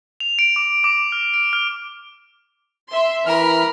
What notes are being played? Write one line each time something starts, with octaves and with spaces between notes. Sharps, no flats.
F7
D7
D6
D6
F6
D7
F6
E5 C6
E3 A#4 B5 F6